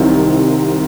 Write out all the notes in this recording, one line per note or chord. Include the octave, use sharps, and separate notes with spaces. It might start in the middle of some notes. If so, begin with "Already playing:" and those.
Already playing: C2 C3 D#3 F#3